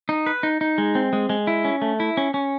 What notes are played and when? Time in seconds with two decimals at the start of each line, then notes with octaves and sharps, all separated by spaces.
0.09 D#4
0.26 B4
0.43 D#4
0.61 D#4
0.78 G#3
0.95 C4
1.13 G#3
1.30 G#3
1.47 E4
1.65 C#4
1.82 A3
2.00 E4
2.17 C#4
2.34 C#4